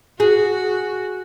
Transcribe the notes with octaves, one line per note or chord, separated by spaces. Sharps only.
F#4 G#4